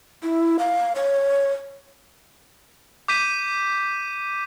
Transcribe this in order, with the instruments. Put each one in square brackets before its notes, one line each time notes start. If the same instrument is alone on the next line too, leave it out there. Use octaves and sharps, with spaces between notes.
[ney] E4
F5
C#5
[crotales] D6 G6 B6 D#7